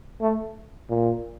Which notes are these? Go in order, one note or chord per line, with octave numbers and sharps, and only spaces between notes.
A3
A#2